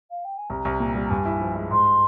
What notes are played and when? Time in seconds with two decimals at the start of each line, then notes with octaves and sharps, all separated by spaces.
0.10 F5
0.24 G5
0.37 G#5
0.49 C2 A#5
0.65 C2
0.80 A#2
0.95 G3
1.05 A#5
1.10 G2 G#5
1.25 E4
1.40 F3
1.55 G#3
1.71 G#2 C6